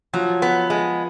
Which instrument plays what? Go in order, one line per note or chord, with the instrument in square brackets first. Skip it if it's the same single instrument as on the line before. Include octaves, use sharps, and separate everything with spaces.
[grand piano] F3 [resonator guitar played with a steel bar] F#3
[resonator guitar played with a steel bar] B3
G#3